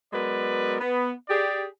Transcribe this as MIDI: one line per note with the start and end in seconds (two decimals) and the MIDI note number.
0.13 0.76 54
0.13 0.76 56
0.13 0.76 59
0.13 0.76 70
0.13 0.76 71
0.13 0.76 74
0.80 1.11 59
1.29 1.65 67
1.29 1.65 68
1.29 1.65 74